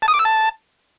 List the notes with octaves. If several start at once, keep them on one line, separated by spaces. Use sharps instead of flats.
A5
D#6
D6
E6
A5